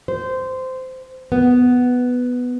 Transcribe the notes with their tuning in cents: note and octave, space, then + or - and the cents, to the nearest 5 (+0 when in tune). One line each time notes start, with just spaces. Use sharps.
C5 -15
B3 +5